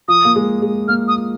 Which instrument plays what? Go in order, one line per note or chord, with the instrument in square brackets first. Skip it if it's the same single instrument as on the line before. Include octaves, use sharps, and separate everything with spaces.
[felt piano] F3 [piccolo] D#6
[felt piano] A#3
G#3
G#3
[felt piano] A#3 [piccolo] F6
[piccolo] D#6